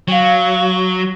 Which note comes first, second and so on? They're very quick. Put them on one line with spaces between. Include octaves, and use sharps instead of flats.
F#3 G5 F5